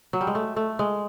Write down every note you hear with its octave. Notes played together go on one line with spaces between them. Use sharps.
F#3
G3
G#3
A3
A3
G#3